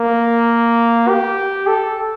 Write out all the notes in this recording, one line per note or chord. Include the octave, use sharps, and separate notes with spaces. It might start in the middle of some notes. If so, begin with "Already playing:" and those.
Already playing: A#3
G4
A4